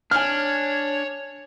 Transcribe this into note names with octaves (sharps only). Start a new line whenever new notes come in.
D4 C#5 G#5 F6